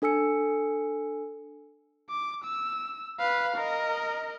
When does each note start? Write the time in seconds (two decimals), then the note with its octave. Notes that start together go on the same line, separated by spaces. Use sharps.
0.02 D4 A4 G#5 E6 C#7
2.09 D6
2.44 E6
3.19 B4 F5
3.57 A#4 D#5